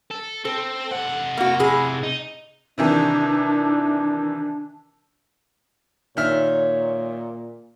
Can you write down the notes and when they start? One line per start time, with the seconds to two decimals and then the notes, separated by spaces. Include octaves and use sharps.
0.11 A4
0.45 C4 A4
0.92 C3 F#5
1.37 A#3 F#4
1.59 A2 G#4
2.03 D#4
2.78 C3 D#3 E3 D4
6.17 A#2 D#3 C#5 E5 F6